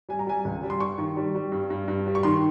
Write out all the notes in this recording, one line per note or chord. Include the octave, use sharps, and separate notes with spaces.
G3 G#5
A#5
G3 G#5
C#2
G3
C6
G2 C#6
D#3
G3
G3
G2
G2
G2
G3
C#6
D#3 C6